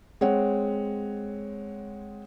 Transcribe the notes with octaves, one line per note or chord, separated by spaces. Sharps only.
G#3 C4 C#5 F#5